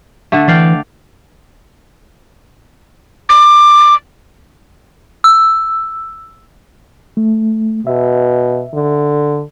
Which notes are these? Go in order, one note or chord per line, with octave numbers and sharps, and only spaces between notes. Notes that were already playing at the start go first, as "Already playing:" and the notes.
D3 A3
E3 D5 F5 G5
D6
E6
A3
B2 E5
D3